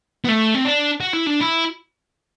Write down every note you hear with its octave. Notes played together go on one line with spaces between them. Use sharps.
B3
A3
C4
D4
F#4
E4
D4
E4